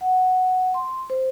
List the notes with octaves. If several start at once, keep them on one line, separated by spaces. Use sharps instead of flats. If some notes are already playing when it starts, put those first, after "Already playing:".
F#5
C6
C5